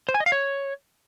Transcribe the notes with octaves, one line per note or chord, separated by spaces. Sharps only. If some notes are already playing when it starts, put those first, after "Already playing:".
C5
G#5
D#5
F5
C#5